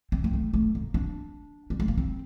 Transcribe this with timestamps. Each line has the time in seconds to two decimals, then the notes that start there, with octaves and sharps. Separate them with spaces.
0.12 C4
0.24 A#3
0.33 A3
0.53 A3
0.75 A#3
0.94 D4
1.70 G3
1.80 A3
1.88 A#3
1.98 C4